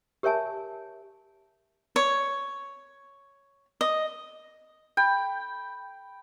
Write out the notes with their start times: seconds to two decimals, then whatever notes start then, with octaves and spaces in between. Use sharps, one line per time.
0.23 G4 A#4 C#5 E5 G#5 A5
1.96 C#5
3.81 D#5
4.97 G5 B5